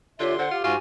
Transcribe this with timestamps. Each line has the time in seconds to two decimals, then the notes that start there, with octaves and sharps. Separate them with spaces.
0.20 D3 F4 G4 C#5 E5 C6
0.39 D3 C5 F#5
0.51 F4 G4
0.64 G#2 F4 F#4 G#5